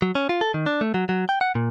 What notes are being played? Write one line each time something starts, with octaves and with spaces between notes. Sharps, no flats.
F#3
C#4
F4
A4
D#3
D4
A3
F#3
F#3
G5
F#5
A#2